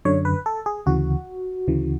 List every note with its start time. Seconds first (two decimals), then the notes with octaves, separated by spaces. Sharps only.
0.05 F#2 D3 C#5
0.25 B4
0.46 A4
0.66 G#4
0.86 D2 C#3 E3 F#4
1.67 D2 C#3 E3